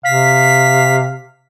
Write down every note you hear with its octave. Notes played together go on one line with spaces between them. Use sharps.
C3 F5 B6